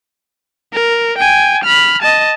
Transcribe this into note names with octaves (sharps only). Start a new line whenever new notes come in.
A#4
G5 G#5
B5 F6
D#5 A5